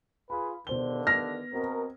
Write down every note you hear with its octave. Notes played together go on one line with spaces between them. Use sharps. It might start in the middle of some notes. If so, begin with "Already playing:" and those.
F4 G#4 B4 B5
G2 B2 D3 D#3 C5 G7
B3 F6 A#6
B2 C4 A#4